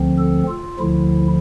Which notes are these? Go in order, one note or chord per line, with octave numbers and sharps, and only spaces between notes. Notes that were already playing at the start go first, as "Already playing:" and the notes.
Already playing: D2 D3 F3 C4
A4
F4
D2 D3 F3 E4